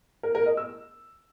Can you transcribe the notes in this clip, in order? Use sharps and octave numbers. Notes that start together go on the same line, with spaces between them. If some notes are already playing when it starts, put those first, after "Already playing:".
A#4
A#4
D#5
E6